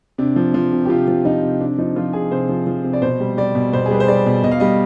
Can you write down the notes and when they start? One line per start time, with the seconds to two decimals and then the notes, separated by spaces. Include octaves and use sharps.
0.18 C3 D4
0.36 F3
0.54 F3
0.72 C3
0.85 G4
0.89 C3 F4
1.08 F3
1.25 F3 D#4
1.43 C3
1.61 C3 D4
1.78 F3 D#4
1.96 F3 F4
2.13 C3 G#4
2.31 C3 C5
2.49 F3
2.67 F3
2.84 C3
2.93 D5
3.02 B2 C5
3.20 G3
3.37 G3 D5
3.55 B2
3.73 B2 C5
3.86 G#4
3.91 G3 B4
4.00 C5
4.08 G3 D5
4.26 B2
4.44 B2 D#5
4.51 F5
4.60 G3 D#5